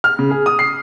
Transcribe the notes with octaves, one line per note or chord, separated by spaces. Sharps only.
F6
C#3
G#4
D#6
C7